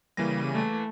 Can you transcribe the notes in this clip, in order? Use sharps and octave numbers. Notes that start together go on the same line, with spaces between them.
C#3 E3 G3 A#3 A#6 D#7
A3